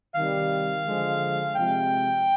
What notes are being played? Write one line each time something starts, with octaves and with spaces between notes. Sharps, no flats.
C3 D#3 G3 F5
D3 F3 G#3
C3 F3 G#3 G5